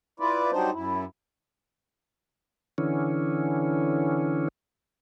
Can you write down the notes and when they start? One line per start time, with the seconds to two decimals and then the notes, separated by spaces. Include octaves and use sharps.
0.20 E4 F4 B4 D5
0.52 F#3 G3 D4 D#4 C5
0.73 F#2 E4
2.78 D3 E3 C#4